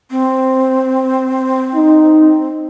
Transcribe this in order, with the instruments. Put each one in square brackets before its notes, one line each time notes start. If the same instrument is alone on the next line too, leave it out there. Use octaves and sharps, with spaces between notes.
[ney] C4
[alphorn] D#4